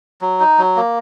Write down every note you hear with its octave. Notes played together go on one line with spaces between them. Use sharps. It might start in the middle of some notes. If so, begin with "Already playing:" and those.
F#3
D#4
F#3
A#3